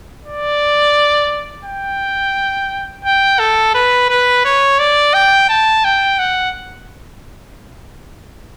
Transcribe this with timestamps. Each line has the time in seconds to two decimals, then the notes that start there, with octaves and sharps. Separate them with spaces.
0.25 D5
1.65 G5
3.05 G5
3.39 A4
3.75 B4
4.09 B4
4.45 C#5
4.79 D5
5.14 G5
5.50 A5
5.84 G5
6.19 F#5